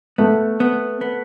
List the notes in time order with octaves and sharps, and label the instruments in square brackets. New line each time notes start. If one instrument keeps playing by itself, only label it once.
[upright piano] A3 [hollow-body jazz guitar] B3
[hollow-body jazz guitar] B3
B3